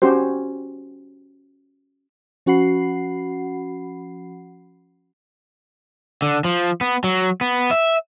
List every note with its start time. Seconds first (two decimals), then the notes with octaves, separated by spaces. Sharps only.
0.02 C#4 F#4 G4 C5
2.46 F3 C#4 F#4 F#5 B5 C7
6.22 D3
6.45 F3
6.81 B3
7.04 F#3
7.41 B3
7.71 E5